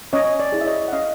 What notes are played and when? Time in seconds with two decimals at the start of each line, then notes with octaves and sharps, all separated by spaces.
0.13 C#4 C#5 D#5
0.40 D5
0.52 E4 G#4
0.61 E5
0.66 C#5 D#5
0.88 F#5
0.92 C#4 D#5 F5